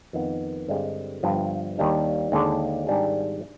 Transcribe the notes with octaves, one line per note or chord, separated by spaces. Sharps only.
F2 D#3 B3
G2 D3 G#3 C4 G4
G1 G2 F3
D#2 D#3 G3 D4
D#2 D3 G#3 D4
G#1 G#2 G3 D4 G#4